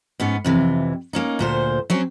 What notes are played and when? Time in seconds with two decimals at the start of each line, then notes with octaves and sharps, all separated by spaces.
0.20 G#2 B3 C#4
0.44 F2 C3 E3
1.13 A#3 C#4 D#4
1.39 D2 A#2 C5
1.90 F#3 C4 C#4